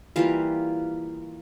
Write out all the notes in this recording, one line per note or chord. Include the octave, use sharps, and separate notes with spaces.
E3 G3 A#3 F4 F5